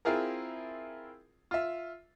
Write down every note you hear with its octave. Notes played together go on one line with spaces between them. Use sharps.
C4 E4 F4 G#4 A#4
F4 E5